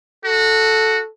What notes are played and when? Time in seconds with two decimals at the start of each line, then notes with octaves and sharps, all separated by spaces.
0.25 F#4 A4